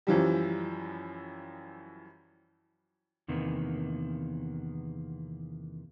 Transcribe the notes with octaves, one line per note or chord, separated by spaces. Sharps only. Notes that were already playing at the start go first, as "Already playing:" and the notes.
F#2 E3 F3 G3
E2 C3 D#3 A#3 B3